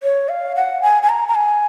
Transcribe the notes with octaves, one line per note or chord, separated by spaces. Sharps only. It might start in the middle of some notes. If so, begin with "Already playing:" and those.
C#5
F5
F#5
G#5
G#5
A#5
A#5
G#5